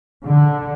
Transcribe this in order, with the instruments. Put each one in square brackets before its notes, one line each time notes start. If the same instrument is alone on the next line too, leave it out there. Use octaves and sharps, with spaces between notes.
[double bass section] D3